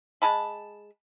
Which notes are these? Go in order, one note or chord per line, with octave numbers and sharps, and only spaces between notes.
G#3 A5 B5